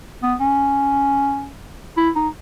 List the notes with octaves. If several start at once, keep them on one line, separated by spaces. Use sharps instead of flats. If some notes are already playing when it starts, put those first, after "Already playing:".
B3
C#4
E4
D#4